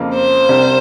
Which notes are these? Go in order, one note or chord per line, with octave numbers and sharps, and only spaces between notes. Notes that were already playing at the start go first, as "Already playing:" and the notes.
Already playing: F2 C#3 F3 A#3 F4
C5
C2 C3 G3